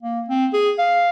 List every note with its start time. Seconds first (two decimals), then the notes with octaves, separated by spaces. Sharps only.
0.03 A#3
0.29 C4
0.53 G#4
0.79 F5